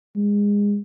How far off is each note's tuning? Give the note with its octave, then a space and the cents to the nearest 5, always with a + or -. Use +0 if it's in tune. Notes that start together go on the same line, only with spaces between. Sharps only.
G#3 -25